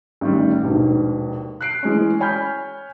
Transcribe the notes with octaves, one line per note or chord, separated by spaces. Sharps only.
A1 D#3 G3
A#1 D#2 G#2 B2
F#6 C7 D7
E3 G#3 C#4
C#5 G#5 B5 F6 G6